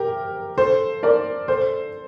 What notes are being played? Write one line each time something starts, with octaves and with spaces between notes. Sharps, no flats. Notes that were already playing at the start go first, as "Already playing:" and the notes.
Already playing: G4 A#4
A4 C5
A#4 D5
A4 C5